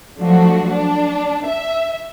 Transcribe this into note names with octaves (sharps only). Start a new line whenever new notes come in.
F3 F#3 A3 D4 F#4
D4
E5